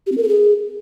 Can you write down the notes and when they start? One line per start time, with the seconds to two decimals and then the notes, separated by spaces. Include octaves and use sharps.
0.06 G4
0.12 C4
0.17 A#4
0.23 A4
0.28 G#4